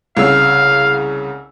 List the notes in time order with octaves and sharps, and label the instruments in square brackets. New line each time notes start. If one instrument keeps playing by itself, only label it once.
[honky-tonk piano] C2 C#3 E6 [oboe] F5